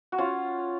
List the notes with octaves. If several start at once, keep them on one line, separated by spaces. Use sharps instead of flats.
F#4
C#4 F4